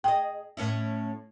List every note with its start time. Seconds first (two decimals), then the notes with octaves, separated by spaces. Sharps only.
0.04 G#4 D#5 G5
0.57 A2 C#4 E4